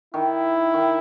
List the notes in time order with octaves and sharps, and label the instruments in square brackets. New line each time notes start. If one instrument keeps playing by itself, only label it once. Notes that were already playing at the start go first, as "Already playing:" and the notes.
[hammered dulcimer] D#3 [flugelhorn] E4
[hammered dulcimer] D#3